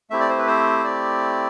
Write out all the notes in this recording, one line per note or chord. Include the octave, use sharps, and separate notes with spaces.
A3 C4 E4 G4 E5
D5
C5
B4
C5
D5